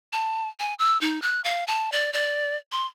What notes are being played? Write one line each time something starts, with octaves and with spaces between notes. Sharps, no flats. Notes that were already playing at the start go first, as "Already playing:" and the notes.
A5
G#5
E6
D#4
F#6
F5
A5
D5
D5
C6